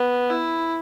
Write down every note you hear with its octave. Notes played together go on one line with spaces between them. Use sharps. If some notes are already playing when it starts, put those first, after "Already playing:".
Already playing: B3
E4